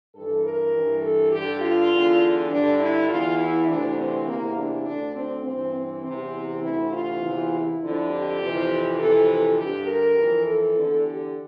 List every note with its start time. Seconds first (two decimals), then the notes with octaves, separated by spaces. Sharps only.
0.14 G2 E3 A4
0.43 A#4
0.73 G2 E3
1.02 A4
1.31 G2 D3 G4
1.60 F4
1.90 E2 D3
2.49 G2 D3 D4
2.79 E4
3.08 E2 E3 F4
3.37 E4
3.68 D2 C3 E3 D4
3.97 C4
4.26 E2 C3 E3 A#3
4.56 D4
4.85 D2 D3 D4
5.15 C4
5.44 G2 E3 C4
5.73 C4
6.03 E2 C3 E3 C4
6.62 D2 C3 E3 E4
6.92 F4
7.21 E2 C3 E3
7.51 E4
7.81 F2 D3
8.09 G4
8.38 F2 C3 E3
8.98 F2 C3 E3 A4
9.28 A4
9.57 G2 D3 G4
9.87 A#4
10.16 F2 E3
10.45 A4
10.75 E2 D3
11.04 G4